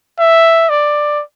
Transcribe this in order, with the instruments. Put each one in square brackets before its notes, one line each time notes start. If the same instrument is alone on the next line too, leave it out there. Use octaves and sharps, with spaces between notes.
[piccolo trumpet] E5
D5